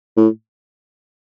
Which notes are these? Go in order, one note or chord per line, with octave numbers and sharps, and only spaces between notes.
A2